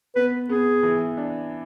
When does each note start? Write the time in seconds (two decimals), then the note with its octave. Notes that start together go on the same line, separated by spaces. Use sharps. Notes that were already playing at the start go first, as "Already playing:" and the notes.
0.16 B3 B4
0.49 B3 G#4
0.83 E3
1.17 D4